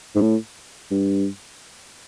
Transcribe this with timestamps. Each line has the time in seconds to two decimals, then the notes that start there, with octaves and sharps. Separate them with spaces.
0.16 G#2
0.22 A2
0.91 G2